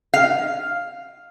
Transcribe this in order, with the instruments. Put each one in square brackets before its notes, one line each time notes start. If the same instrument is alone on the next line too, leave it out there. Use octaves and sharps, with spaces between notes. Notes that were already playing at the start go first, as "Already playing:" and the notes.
[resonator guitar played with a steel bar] F5